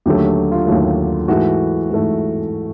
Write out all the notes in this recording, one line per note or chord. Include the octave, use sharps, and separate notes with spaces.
D#2 D3 F#3 A3 G4
F4
D#2 D3 F#3 A3
G#2 E3 A3 F#4
G#2 E3 A3